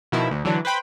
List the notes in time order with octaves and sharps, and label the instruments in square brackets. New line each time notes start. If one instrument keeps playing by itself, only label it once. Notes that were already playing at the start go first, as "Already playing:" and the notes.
[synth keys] B2 D#3 F3 E4
D2
D3 E3 F#3 D4
B4 C5 G5 B5